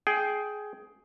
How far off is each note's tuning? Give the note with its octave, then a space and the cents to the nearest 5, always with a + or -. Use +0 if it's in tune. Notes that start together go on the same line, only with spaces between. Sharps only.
G#4 +15 G5 -5